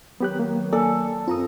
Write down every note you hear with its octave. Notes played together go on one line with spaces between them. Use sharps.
D#3 F#3 B3 G4 F#6
A#3
A#3 A4 D5
F#2 C4 F4 A#5 D#6